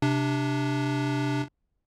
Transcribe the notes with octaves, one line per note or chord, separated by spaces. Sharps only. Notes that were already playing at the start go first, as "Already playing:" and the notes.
C3 D4